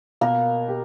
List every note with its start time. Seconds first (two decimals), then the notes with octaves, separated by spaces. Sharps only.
0.21 B2 A#3 A#4
0.68 G4